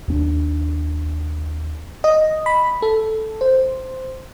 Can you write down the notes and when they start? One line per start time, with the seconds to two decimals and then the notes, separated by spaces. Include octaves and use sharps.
0.08 D#2 C4 D4
2.04 D#5
2.46 B5
2.82 A4
3.41 C5